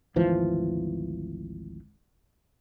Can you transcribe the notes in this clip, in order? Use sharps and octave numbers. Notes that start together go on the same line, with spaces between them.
G#1 D2 E3 F3